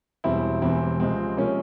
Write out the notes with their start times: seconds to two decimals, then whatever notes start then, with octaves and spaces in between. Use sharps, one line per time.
0.24 E1 E2 E3 G3 C4 E4
0.62 E1 E2 E3 G3 C4 E4
1.00 C#2 C3 F3 G#3 C4
1.37 C3 F3 G#3 A#3 C#4